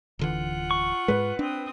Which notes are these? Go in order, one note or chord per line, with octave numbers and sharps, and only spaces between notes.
D1 D3 E3 F4 F#5
C#6
G#2 G#3 B4
C4 D4 D#6